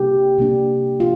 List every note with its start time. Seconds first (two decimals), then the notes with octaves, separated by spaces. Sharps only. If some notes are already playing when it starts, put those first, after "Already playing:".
Already playing: C3 G3 A#3 D4 G4
0.38 C3 G3 A#3 D4
1.00 F4